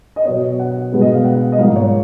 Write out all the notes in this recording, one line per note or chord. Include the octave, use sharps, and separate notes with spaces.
D#5
B2 F#3 B3 C#5
D#5
F#5
B2 G#3 B3
D#5
F5
F#5
D#5
G#2 F3 A#3 F5
C#5